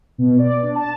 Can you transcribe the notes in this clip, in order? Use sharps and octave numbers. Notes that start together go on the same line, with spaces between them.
B2
D5
D4
A5